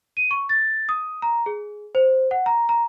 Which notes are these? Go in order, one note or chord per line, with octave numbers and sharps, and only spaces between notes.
D#7
C#6
A6
D#6
A#5
G#4
C5
F#5
A#5
A#5